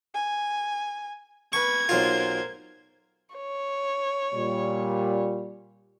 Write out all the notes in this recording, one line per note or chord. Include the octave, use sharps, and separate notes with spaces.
G#5
B4 C#6 G#6
B1 F4 A#4 C5
C#5
A#2 G3